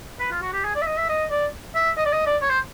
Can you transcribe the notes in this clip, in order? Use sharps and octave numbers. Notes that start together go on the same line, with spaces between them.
B4
F4
F#4
G4
G#4
D5
E5
D#5
E5
D#5
D5
E5
D#5
D5
D#5
D5
C#5
C5